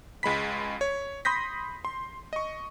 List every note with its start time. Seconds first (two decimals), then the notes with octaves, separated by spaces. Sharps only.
0.23 C#2 G#3 B5 B6
0.81 C#5
1.25 B5 C6 D#6 G6 A#6 B6
1.85 C6
2.33 D#5 C#6